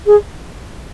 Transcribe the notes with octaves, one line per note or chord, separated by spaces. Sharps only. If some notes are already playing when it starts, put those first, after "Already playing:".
G#4